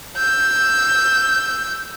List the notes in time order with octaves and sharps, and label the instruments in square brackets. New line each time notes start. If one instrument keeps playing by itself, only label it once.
[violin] E6 G6